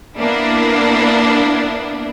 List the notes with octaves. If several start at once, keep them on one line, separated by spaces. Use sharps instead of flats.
A#3 B3 D4 E4